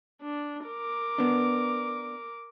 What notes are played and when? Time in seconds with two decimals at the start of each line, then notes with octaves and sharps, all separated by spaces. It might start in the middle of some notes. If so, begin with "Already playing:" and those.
0.22 D4
0.68 A#4 D6
1.18 B3 D4